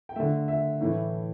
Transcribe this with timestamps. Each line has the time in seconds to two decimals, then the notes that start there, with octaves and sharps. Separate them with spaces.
0.09 G5
0.16 D3 A3 E5
0.48 E5
0.81 A2 E3 A3